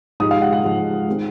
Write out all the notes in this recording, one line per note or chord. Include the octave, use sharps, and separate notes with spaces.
G#2 F3 G#3 D#6
F5
F#5
F#5
G#2 F3 G#3
D#3 G#3 C4